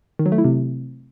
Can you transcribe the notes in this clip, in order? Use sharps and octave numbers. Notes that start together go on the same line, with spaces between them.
D#3
F#3
A3
E4
C3